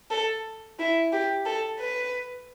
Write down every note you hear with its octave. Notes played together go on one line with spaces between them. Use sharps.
A4
E4
G4
A4
B4